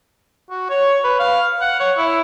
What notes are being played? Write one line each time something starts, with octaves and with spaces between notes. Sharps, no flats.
F#4
C#5
B4
F5
F#5
C#5
E4